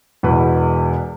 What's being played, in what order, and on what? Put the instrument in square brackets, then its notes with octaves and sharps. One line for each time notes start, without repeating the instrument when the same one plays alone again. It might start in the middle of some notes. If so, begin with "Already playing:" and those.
[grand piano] E1 E2 B2 B4